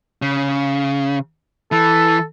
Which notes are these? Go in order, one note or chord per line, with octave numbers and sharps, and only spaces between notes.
C#3
E3 A4